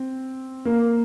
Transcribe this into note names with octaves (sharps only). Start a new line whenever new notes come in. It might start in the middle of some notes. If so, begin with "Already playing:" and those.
Already playing: C4
A#3